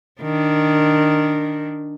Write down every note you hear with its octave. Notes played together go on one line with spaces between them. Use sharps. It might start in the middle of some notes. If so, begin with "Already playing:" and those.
D#3 D4